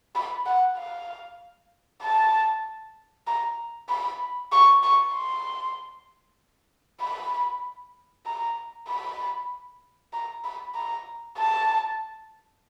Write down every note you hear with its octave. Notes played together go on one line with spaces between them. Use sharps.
B5
F#5
F5
A5
A#5
B5
C#6
C#6
C6
B5
A#5
B5
A#5
B5
A#5
A5